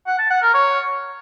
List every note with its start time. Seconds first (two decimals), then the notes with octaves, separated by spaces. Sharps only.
0.07 F#5
0.18 A5
0.30 F#5
0.42 A#4
0.54 C#5